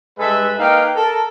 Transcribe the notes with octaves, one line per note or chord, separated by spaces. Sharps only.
G2 G#3 A4 B4 E5
A#3 D#4 B4 F5 G5
A4 A#4